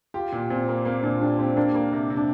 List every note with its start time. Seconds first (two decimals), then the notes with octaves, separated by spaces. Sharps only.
0.14 F4 G4
0.32 A#2
0.50 A#2 C4
0.68 A#3
0.85 A#3 C4
1.03 A#2 D4
1.16 F4
1.22 D4 G4
1.39 C4 G4
1.57 A#3 D4
1.75 A#3
1.93 C3
2.10 C3
2.17 D4